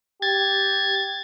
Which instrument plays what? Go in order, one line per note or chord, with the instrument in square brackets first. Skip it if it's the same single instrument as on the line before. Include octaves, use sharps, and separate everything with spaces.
[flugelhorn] G4 [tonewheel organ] G#6 A6